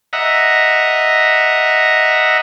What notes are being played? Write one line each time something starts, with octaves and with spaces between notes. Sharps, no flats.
D#5 E5 F#5 A#5